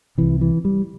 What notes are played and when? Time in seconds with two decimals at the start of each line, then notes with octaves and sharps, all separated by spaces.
0.18 C2 C3 E3
0.41 E3
0.65 G3